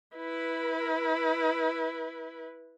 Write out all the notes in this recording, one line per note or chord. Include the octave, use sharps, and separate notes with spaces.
E4 B4